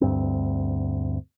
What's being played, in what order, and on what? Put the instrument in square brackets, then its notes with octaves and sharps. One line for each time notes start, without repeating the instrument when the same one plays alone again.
[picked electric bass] D2 G2 C4